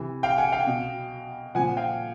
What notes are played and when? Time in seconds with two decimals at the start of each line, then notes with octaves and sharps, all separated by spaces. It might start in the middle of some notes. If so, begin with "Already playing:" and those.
Already playing: C3 E3
0.23 F5 G5
0.38 F#5 G#5
0.52 F5 G5
0.67 B2
1.55 A#2 F3 F#5 G#5
1.77 F5 G5